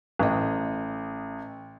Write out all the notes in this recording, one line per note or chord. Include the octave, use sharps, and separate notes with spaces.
A1 D#5